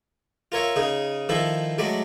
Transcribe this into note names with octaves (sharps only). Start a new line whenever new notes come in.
F4 A#4 C#5 E5
C#3 D#4 G#4
D#3 F3 E4 A4
F#3 G#3 A3 D5 B5